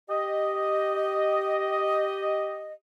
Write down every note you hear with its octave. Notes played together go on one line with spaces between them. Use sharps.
G4 D#5